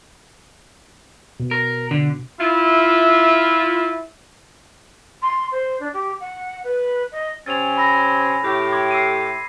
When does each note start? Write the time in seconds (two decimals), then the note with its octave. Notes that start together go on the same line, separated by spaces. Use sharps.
1.40 B2
1.51 A#4
1.91 D3
2.39 E4 F4 E5
5.22 C6
5.52 C5
5.80 D4
5.94 G4
6.20 F#5
6.64 B4
7.12 D#5
7.46 C3 C4 C#4 A6 F7
7.77 B5 E6 A#6
8.44 A2 G4
8.73 C6 D6 G#6
8.91 E6 C7 D#7